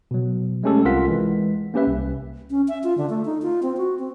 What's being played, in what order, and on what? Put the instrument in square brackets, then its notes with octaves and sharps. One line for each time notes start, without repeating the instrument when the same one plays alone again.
[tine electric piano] B2 F#3
G#3 A3 C#4 G4 A4
C2 C4 F4 A#4 F#5 B6
E3 G#3
A#3 C#4 G4 B4 E5
C2
[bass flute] C#4
E5
F4
D3
A3
D#4
F4
C4
F#4
C4